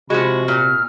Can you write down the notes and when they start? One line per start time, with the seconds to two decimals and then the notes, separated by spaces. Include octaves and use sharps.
0.10 C3 F3 G#3 F#4 B5
0.48 A#2 F6